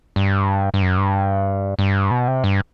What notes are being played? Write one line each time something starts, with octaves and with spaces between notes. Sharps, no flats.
G2
G2
F#2
G2
G2
B2
C3
G2